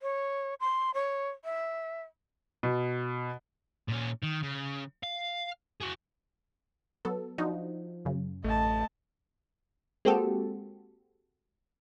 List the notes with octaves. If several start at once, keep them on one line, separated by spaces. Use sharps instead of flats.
C#5
C6
C#5
E5
B2
A#2 C#4
D#3
C#3
F5
F#4 G#4
F#3 B3 A4
F3 D4 D#4 F#4
F#2 C#3
A1 A3 D#5 A5
G#3 A#3 C4 F#4 G4 A4